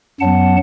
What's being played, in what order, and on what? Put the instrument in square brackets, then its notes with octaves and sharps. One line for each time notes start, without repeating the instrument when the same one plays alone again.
[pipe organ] F#2 F#3 B3 F#5 A5